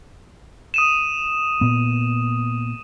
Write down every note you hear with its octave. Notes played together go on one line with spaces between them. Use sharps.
D#6 D#7 E7
A#2 B3